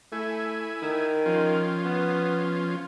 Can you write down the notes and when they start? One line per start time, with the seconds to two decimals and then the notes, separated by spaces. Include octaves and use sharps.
0.12 A3 E4 G#5
0.82 D#3
1.26 F3 C#4 F4
1.85 B3